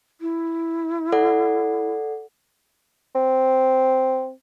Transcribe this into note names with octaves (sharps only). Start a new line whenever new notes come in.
E4
A4 D5 F#5
C4